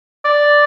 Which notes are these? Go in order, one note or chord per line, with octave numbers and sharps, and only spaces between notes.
D5